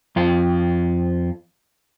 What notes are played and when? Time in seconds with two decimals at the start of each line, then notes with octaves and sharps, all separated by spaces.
0.16 F2 F4